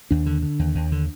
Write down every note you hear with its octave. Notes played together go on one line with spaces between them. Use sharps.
D#2 D4
D3
D3
D#2
D#2
D3